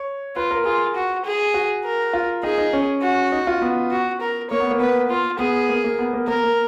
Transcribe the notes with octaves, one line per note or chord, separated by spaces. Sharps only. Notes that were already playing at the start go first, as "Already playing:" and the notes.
Already playing: C#5
F4 B4
A#4
F4 G#4
F#4
G#4
F#4
A#4
F4
D#4 G#4
D#4
C#4
F#4
D#4
F4
B3
F#4
A#4
A#3 C#5
B3
A#3
B3 B4
F4
B3 G#4
A#3
A#3
B3
A#3
A#3 A#4
A#3